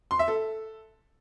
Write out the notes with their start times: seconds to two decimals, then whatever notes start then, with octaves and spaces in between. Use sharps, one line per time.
0.11 C6
0.19 E5
0.28 A4